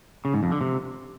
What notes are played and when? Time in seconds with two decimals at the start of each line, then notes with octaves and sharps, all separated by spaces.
0.25 C#3
0.34 G#2
0.43 F2
0.52 D3
0.61 C3